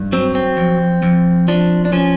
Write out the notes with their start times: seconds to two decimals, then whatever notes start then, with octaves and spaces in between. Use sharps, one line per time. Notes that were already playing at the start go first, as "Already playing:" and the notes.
Already playing: G2
0.12 F#3 C4
0.35 C4
0.57 F2
1.02 F2
1.48 F3 D4
1.85 D4
1.93 F3 C#4